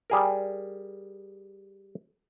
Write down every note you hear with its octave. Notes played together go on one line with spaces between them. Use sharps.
G3 G#4 A#4